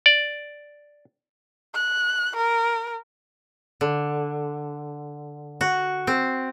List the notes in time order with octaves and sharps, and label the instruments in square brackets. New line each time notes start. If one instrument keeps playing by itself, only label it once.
[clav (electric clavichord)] D5
[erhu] F#6
A#4
[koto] D3
F#4
C4